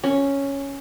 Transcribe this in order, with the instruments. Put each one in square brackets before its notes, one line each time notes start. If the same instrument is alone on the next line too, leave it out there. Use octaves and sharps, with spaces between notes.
[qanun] C#4